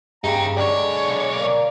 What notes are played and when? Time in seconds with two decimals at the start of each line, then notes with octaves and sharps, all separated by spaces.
0.24 G2 C#3 D#4 G4 A#5
0.57 B1 D3 G#3 C#5 D5
1.32 A#3 D5